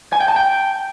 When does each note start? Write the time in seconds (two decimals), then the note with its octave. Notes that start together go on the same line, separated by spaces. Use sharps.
0.13 G#5
0.20 G5
0.28 A5
0.36 G5